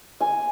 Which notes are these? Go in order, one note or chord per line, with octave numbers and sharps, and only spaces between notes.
G#5